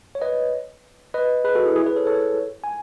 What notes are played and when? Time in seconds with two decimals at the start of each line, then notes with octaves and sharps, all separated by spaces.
0.15 C#5
0.22 B4 D#5
1.14 B4 D#5
1.44 G#4 B4
1.55 F#4 A4
1.65 E4 G#4
1.76 E4 G#4
1.86 G#4 B4
1.96 A4 C#5
2.07 A4 C#5
2.64 G#5